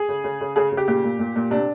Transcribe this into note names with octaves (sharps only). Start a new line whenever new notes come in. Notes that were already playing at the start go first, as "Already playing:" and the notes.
Already playing: G#4
C#3
C#3
C#3
C#3 G#4
C#3
G4
A#2 G4
A#2
A#2
A#2
C3 D4